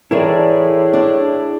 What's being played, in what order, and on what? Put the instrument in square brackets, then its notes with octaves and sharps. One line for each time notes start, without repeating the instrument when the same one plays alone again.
[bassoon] A2 [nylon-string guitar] E3 A#4 A5 [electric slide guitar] E4 G#4 D5
[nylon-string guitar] D4